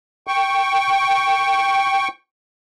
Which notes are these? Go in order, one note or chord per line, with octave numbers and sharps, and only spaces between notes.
G5 C#6